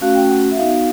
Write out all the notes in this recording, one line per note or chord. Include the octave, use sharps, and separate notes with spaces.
A3 C#4 F#4 F5
G5
F#5
E5
B3 D#4 F#4 F5